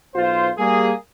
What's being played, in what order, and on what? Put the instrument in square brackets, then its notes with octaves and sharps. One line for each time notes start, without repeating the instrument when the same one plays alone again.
[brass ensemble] B1 F4 C5
G3 A#3 G#4